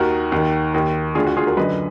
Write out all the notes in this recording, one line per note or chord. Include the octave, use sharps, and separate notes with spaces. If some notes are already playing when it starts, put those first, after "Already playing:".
Already playing: D#2 D#3 F#4 A#4
D#2 D#3
D#2 D#3
D2 D3 F4 G#4
F#4
F4 G#4
F#4 A#4
F#2 D3 B4 D#5